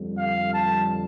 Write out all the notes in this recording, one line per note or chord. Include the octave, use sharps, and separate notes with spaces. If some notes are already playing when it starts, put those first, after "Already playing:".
Already playing: F2 D3 G3
F5
A5